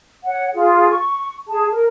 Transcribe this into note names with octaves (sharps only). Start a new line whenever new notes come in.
C#5 F#5
F4 G#4
C#6
G#4 A5
A#4